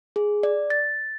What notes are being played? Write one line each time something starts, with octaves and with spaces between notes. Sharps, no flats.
G#4
D5
A6